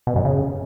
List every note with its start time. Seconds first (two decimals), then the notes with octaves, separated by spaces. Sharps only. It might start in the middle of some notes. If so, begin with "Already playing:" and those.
0.07 B2
0.16 F#2
0.25 C#3